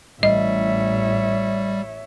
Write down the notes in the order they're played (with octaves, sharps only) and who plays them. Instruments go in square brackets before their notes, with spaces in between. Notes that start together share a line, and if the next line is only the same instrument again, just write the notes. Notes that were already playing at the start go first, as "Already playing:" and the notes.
[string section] A1 [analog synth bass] G3 [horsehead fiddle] C#5 E5 [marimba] D#5